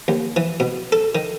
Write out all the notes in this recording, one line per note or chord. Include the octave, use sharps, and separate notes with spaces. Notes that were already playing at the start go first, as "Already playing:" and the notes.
D#2
E3
B2
A4
D#3